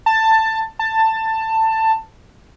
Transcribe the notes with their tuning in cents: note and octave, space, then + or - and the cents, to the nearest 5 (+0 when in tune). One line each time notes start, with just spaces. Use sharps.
A5 +15
A5 +15